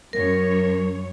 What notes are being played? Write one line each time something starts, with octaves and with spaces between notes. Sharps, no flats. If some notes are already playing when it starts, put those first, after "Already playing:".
F#2 A#4 C#5